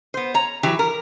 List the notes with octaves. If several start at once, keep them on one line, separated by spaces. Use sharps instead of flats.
B3 C5
C#5 A#5
E3 F#3 G4
A#4